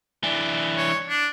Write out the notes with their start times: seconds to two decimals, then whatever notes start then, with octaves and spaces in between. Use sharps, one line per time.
0.24 E3 D4
0.77 C#5
1.09 D4